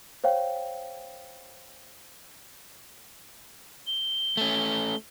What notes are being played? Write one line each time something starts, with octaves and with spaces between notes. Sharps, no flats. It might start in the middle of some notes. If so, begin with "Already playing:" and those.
C5 C#5 F5 G5
G7
A3 C#4